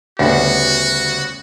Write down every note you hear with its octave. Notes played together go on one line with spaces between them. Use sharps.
D2 C#3 G3 B3 F#4